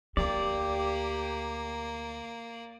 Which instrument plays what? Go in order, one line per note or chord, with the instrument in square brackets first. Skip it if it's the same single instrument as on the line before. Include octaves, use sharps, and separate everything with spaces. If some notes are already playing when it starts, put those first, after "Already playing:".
[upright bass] D2 D#4 [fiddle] A#3 [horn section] G4 [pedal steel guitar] D5